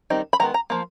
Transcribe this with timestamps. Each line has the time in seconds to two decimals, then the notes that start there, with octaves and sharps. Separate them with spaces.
0.10 D#3 G3 C4 D#4
0.33 B5
0.40 D#3 G#3 B3 A#5
0.54 A#5
0.70 F3 A#3